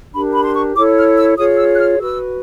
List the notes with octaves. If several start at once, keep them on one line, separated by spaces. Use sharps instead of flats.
D4 G4 A#4 B5
B5
C6
C#6
E4 A4 C#5 D6
F6
E6
F4 G#4 C#5 D#6
E6
F#6
F6
F#4 B4 E6